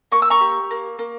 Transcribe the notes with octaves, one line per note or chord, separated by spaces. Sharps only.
A#3 C#6
E6
A#5 C#6
G4
A#3
A#3